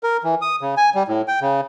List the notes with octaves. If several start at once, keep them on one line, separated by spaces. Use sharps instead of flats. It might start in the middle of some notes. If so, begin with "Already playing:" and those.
A#4
E3
D#6
C#3
G#5
G3
A2
G5
C#3